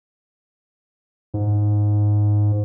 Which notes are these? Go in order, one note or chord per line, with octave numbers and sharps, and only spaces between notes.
G#2